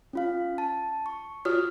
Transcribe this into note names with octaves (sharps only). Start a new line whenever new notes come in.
C#4 F4 F5
A5
C#6
F4 F#4 C#5 F6